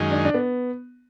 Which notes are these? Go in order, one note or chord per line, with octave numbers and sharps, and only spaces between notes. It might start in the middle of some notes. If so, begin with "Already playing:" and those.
Already playing: F#2 D#3 G#3
D4
D4
B3